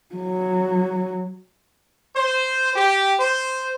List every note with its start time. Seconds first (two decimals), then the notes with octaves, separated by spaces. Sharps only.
0.15 F#3
2.15 C5
2.75 G4
3.19 C5